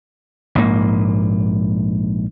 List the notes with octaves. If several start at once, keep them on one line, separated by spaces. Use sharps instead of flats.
A#1 G#2 A#3